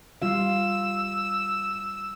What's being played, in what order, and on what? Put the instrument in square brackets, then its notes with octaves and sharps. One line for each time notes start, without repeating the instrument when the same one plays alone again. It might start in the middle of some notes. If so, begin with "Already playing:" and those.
[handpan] G3 F4 F5 [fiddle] E6